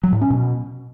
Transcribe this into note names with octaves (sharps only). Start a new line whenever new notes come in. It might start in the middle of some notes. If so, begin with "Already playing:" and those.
F#3
A2
C#4
B2